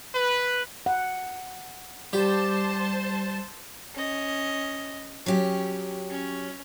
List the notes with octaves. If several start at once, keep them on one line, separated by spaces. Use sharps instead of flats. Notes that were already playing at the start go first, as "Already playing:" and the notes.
B4
F#5
G3 G4 C5 A5
C#4 D#5
F#3 C#4 G4
C#4